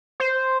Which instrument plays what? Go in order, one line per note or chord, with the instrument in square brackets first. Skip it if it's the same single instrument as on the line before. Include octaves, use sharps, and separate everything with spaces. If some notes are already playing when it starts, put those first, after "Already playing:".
[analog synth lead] C5